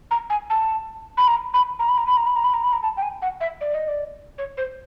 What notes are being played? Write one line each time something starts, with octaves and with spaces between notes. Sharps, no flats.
A#5
G#5
A5
B5
A#5
B5
A#5
B5
A#5
B5
A#5
B5
A#5
B5
A#5
B5
A#5
A5
G5
G#5
F#5
E5
D5
D#5
D5
C#5
C5